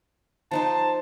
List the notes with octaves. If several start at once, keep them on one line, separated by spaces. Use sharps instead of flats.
F3 D#4 C5 A5